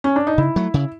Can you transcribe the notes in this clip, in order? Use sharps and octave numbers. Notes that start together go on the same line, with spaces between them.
C#4
D4
D#4
C#3 E4
F#3 A3
C#3